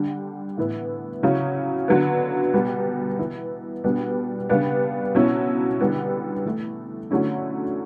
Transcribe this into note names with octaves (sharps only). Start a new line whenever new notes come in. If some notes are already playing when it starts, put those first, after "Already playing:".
Already playing: D3 G3 D4
A2 E3 B3 E4
C#3 F#3 C#4 E4
D3 F#3 B3
B2 G3 B3
E3 B3 E4
B2 G3 B3 D4
C#3 G3 B3 D4
B2 F#3 C#4 E4
D3 G3 B3 E4
E3 A3 E4
D3 F#3 A3 C#4 E4